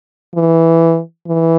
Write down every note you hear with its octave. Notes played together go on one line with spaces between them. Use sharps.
E3
E3